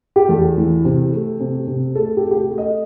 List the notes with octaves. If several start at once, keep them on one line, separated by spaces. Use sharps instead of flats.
G4
E2 A4
E3
C3
A3
C3
C3
A3 A4
G4
A3
G4
A4
A3
D#5